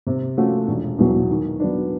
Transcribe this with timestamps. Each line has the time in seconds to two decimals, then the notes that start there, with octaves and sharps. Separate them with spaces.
0.07 C3
0.37 F3 A3 C#4 F#4
0.67 E1
0.98 E2 B2 F#3
1.29 D#3
1.60 F#3 B3 D4